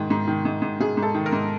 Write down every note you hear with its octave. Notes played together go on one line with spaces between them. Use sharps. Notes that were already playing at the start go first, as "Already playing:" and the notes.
Already playing: G#2 D#3
G#2
D#3
G#2
G#2
G#2 G#4
G#2
A4
D#3
A#4
G#2